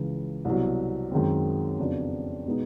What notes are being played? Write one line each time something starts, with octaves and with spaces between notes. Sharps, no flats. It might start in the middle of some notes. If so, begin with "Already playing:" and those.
Already playing: C#2 C#3 E3
C2 B2 F#3
F#2 D#3 G#3 C4
F2 C#3 F#3 B3 D4
B2 G#3 B3 D#4